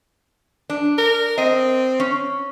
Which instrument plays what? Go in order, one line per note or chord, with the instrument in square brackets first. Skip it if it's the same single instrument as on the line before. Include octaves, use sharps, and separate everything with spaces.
[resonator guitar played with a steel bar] D4
[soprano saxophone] A#4
[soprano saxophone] C4 [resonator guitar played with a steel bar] D#5
[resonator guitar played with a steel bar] C#4